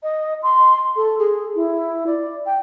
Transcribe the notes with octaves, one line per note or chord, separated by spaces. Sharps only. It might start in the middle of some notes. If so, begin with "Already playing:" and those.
D#5
C6
A4
G#4
E4
D5
G5